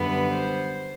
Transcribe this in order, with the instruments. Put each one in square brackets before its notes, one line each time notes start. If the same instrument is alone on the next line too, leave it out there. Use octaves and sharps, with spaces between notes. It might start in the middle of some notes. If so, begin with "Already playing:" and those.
Already playing: [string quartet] F#2 D3 G3 B3 B4
C5